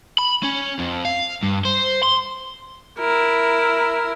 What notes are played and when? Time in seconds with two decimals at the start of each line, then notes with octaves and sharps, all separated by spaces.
0.19 B5
0.44 C#4
0.79 F2
1.05 F5
1.43 G2
1.65 C5
2.03 C6
2.99 E4 A#4